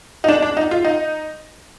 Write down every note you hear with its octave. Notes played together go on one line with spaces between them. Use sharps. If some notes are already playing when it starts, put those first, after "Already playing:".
D#4
D4
D4
D#4
F4
D#4